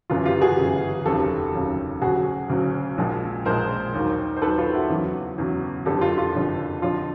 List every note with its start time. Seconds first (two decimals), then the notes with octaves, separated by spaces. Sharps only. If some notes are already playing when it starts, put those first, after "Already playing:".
0.10 G1 F#2 C#3 E3 F4
0.25 F4 G4
0.41 F#4 G#4
0.57 G1 F#2 C#3 E3
1.05 F1 D#2 C#3 F#3 G4 A4
1.54 F1 D#2 C#3 F#3
2.02 D2 C#3 F#3 F#4 G#4
2.50 D2 C#3 F#3
2.98 A#1 A#2 F3 G#3
3.45 A#1 A#2 F3 G#3 A#4 C5
3.94 D#2 D#3 F#3
4.37 C5
4.42 D#2 D#3 F#3 A4 B4
4.58 F4
4.74 E4 F#4
4.89 E2 C#3 F#3
5.38 E2 C#3 F#3
5.86 F#1 F2 D3 G4 A4
6.01 F4
6.18 F4
6.35 F#1 F2 D3
6.81 F2 D3 F3 F4